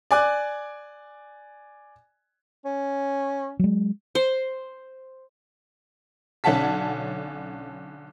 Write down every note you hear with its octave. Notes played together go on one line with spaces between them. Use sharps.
D5 G#5 D6 F#6
C#4
F#3 G#3
C5
B1 D3 C#4 F#5 A5 B6